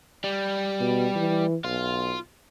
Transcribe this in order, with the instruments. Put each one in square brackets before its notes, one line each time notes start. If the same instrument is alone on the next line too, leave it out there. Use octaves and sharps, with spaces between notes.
[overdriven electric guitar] G3
[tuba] B2
E3
[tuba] B1 [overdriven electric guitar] F4